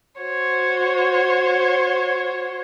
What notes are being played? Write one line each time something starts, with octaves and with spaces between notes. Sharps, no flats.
F#4 C5 C#5